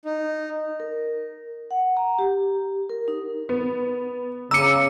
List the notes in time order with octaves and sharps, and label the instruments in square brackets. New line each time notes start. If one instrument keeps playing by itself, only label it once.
[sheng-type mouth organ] D#4
[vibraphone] A#4
F#5
A#5
G4
A#4
D#4
[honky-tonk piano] B3
[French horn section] C#3 [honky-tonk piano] A#5 D6 D#7 [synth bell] E6 C#7